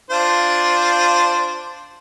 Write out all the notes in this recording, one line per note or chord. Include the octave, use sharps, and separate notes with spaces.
D4 F4 C5